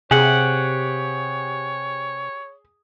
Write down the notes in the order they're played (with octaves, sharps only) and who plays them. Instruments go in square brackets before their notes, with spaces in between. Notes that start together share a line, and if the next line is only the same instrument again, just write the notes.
[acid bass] C3 [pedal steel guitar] G4 F#5 [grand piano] G#4 [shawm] C#5